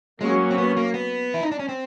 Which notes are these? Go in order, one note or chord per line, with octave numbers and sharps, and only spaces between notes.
F#3 G#3 A#3 C#4 F#4
C4
B3
A#3
B3
E4
D#4
D4
C#4
C4